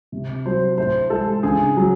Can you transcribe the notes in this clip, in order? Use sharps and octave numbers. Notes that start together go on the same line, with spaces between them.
C3
F#3 C5
A2 C5
G#3 A4
C#3 G#4
F#3